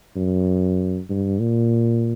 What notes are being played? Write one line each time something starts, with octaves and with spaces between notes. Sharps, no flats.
F#2
G2
A#2